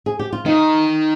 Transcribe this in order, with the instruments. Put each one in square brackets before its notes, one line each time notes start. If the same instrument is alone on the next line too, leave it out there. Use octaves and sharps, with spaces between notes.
[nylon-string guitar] G#4
G4
F4
[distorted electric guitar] D#3 [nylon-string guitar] D#4